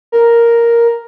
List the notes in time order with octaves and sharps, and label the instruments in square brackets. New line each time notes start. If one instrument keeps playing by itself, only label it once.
[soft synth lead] A#4